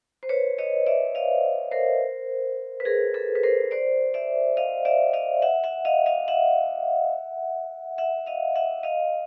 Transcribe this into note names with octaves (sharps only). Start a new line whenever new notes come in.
C5
B4 C#5
C#5 D#5
D5 E5
D#5 F5
A#4 C5
B4
G#4 A#4
A4 B4
B4
A#4 C5
C5 D5
D5 E5
D#5 F5
D5 E5
D#5 F5
E5 F#5
E5 F#5
D#5 F5
D#5 F5
E5 F#5
E5 F#5
D#5 F5
E5 F#5
D#5 F5